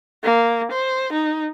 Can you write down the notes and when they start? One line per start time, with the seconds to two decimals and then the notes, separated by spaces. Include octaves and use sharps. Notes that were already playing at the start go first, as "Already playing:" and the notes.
0.24 A#3
0.72 C5
1.13 D#4